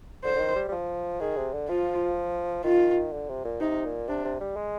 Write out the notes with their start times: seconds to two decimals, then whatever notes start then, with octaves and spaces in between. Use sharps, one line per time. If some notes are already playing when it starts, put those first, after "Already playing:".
0.24 D3 C5
0.35 D3
0.40 D#3
0.56 G3
0.68 G3
0.72 F3
1.20 D#3 G#4
1.37 C3
1.53 D3
1.68 F3 F4
2.64 D#3 F4
3.12 D3
3.29 C3
3.45 A#2
3.60 C3 D#4
3.85 A#2
4.08 C3 D4
4.24 C3
4.40 G3
4.56 G#3